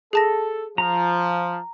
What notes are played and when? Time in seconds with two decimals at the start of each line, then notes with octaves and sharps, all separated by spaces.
0.13 G#4 A4 A5 A#6
0.78 F3 A#5